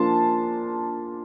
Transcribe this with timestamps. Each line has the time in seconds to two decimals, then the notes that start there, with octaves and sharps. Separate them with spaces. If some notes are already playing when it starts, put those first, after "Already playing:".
Already playing: F3 A#3 D4 F4 A5 C6